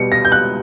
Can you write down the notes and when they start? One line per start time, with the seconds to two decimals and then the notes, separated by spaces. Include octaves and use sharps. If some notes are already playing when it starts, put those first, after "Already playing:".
Already playing: B2 G3 C#7
0.12 A#6
0.25 G6
0.32 F#6